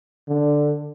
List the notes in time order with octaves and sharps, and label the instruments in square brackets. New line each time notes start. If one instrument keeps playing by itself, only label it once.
[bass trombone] D3